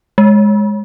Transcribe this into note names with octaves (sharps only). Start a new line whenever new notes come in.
G#3